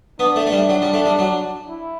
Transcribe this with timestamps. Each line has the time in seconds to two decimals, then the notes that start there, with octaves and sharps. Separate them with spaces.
0.19 B3 D4
0.36 A3
0.47 A3
0.52 G3
0.69 F#3
0.82 G3
0.93 A3
1.05 G3
1.19 F#3
1.67 E4